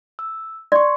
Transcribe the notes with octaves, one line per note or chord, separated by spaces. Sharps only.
E6
D5 C6 C#6